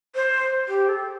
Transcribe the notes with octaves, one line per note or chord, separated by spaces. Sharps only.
C5
G4
A4